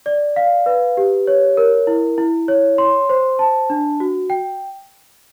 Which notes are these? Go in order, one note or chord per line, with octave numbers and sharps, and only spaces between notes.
D5
F5
B4
G4
C#5
A#4
E4
E4
C#5
C6
C5
A5
D4
F#4
G5